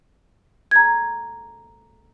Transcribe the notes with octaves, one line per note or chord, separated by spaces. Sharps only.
A#5 G#6